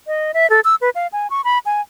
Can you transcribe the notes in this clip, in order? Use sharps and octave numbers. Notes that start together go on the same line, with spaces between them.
D#5
E5
A4
E6
B4
F5
G#5
C#6
B5
G#5